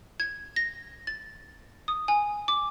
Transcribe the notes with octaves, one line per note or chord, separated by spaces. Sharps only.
G#6
A#6
A6
D#6
G#5
D6